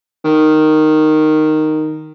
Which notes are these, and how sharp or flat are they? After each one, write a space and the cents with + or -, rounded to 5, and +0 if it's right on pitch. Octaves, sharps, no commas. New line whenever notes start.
D#3 -5